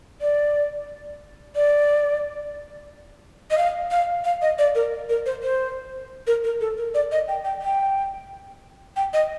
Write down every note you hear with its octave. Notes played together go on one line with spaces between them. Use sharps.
D5
D5
D#5
F5
F5
F5
D#5
D5
A#4
A#4
C5
C5
A#4
A#4
A4
A#4
D5
D#5
G5
G5
G5
G5
D#5